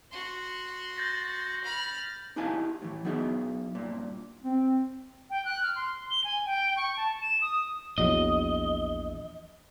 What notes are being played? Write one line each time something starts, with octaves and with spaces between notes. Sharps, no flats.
F#4 C6
G6 A6 A#6
B5 F6
D#4 E4 G4 F5 G#5 A5
A2 E3
F#3 B3 D#4 G#4 E5
G2 A#2
C4
G5
F#6
F6
C6
G7
G#5
G5
C#6
A5
E7
D#6
A#1 E2 F#3 D#5